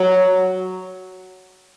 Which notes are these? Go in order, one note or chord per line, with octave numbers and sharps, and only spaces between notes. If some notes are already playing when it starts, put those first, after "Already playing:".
Already playing: F#3